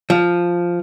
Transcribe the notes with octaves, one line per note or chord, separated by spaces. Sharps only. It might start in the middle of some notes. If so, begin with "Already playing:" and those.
F3